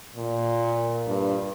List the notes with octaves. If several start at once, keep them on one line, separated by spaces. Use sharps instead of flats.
A#2
G2